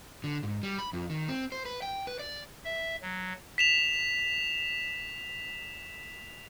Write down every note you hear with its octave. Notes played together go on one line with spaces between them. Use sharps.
D3
G#2
G3
B5
F2
D#3
C4
C5
B4
G5
B4
D5
E5
F#3
B6 E7 F7